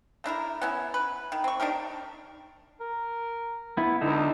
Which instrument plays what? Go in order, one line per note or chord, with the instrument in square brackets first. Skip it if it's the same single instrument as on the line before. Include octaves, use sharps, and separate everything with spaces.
[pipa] A3 D4 E4 A#4
B3 C#4 E4
B4
D#3
C4 C#6
D4 D#4 G4 A#4
[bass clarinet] A#4
[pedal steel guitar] B3 E4
[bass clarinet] C#2 [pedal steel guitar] D3 D#4 A4